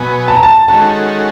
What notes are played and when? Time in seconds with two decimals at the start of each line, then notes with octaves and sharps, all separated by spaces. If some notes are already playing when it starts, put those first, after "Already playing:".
Already playing: B2 F#3 B3 G#5
0.28 A5
0.36 A#5
0.43 A5
0.68 D#3 G#3 C#4 F#4 A4 A5